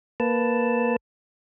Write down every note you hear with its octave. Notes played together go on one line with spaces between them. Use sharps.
A#3 B4 A5